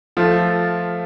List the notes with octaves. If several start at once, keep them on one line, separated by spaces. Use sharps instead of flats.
F3 A3 F4